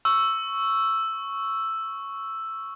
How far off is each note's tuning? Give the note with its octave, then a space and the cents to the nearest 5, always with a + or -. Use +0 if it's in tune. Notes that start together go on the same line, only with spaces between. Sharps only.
C#6 +0 E6 +5